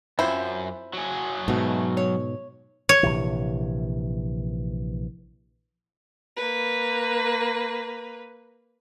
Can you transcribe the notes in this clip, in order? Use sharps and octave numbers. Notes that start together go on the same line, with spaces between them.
F#2 C4 E4 F4 C5
F#3 G#4
G#2 B2 A3
C#5
C#5
A#1 C3 E3
A#3 B4